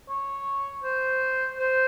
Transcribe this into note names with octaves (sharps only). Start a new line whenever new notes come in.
C#5
C5
C5